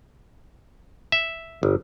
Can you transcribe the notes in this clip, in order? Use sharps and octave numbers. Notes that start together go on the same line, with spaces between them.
E5
G1